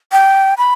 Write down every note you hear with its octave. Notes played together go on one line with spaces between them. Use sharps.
G5
B5